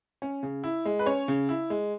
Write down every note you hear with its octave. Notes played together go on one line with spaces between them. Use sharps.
C#4
C#3
E4
G#3
B4
C#4 C#5
C#3
E4
G#3